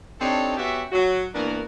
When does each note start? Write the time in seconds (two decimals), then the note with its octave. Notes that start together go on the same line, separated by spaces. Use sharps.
0.20 C4 D4 D#4 G4 A4 C#5
0.57 B3 C#4 F#4 G4 E5
0.91 F#3 F#4
1.33 E3 A#3 B3 D4 F#4 A#4